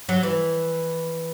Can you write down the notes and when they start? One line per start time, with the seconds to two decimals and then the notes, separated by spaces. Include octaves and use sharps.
0.09 F#3
0.23 E3